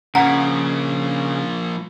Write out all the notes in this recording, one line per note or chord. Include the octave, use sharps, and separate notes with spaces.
C#3 F3 A#3 F#5 A#5 B6 C#7